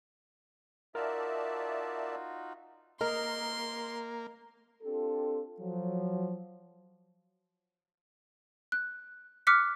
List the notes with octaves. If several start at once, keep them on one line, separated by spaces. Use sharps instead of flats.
D#4 F4 F#4 A#4 D5 E5 A5
A#3 A#4 D#5 C6
C4 D4 F4 G4 A4
F3 F#3
F#6
D6 F6 F#6 B6 C#7